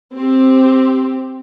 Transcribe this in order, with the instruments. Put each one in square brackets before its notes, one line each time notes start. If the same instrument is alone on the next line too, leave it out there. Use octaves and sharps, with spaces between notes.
[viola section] C4 G4